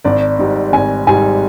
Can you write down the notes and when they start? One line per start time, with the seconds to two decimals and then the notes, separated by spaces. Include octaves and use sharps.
0.04 G#1 D5
0.39 G#2 G3
0.73 G#1 G#5
1.07 G#2 G3 G#5